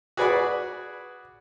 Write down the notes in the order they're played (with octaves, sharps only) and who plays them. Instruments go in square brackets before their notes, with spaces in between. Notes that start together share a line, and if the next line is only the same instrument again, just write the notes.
[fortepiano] F#4 G#4 B4 D5 B5